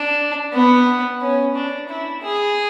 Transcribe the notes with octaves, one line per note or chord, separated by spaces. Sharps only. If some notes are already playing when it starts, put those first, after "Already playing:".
Already playing: D4
B3
C#4
D4
E4
G#4